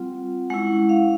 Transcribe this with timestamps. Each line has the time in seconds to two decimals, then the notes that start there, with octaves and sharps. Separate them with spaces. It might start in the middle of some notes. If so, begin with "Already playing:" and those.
Already playing: G3 C4 F4 F#5
0.50 G#3 C#4 E4 F#5
0.89 F5